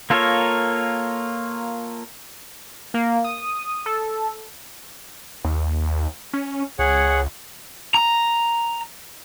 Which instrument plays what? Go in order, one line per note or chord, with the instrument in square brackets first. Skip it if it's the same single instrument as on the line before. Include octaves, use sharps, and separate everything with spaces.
[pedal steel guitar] A#3 F4 A4 A#4 C#5
[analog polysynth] A#3
D#6
A4
[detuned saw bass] D#2
C#4
[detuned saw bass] C#2 [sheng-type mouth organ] G#4 C#5 F#5
[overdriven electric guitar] A#5